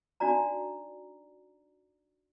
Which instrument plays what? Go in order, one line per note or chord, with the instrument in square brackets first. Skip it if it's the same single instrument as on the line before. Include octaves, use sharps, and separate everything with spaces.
[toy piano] D4 D#4 F#4 D5 A#5